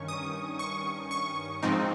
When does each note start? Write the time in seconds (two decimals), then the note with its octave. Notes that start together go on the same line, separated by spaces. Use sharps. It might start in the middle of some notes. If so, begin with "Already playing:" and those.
Already playing: G2 D#3 C#4 C#6
0.08 D#6
0.59 C#6
1.11 C#6
1.63 G#2 F3 C4 D#4